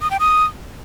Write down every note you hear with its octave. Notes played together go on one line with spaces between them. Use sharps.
D#6
G5
D#6